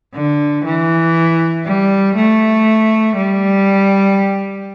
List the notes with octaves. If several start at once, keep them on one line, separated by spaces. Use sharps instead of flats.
D3
E3
G3
A3
G3